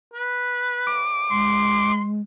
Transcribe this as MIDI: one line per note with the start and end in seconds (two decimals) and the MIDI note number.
0.14 1.02 71
0.87 1.92 86
1.31 2.22 56
1.31 2.04 84